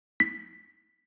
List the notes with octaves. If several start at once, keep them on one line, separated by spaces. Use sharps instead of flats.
B6